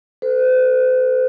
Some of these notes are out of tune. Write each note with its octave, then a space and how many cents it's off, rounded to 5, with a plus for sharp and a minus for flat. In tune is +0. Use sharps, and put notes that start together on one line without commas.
A4 +10 C5 -40